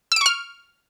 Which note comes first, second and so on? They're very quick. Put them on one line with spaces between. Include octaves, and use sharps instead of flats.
E6 D7 C#6 F6